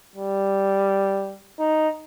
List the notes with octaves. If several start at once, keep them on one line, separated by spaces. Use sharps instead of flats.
G3
D#4